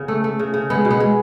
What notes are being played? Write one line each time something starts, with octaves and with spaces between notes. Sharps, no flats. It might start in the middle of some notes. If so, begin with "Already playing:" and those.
Already playing: C#3 B3
A3
A3
C#3
C#3
G#3 B3
B2
B3
G#3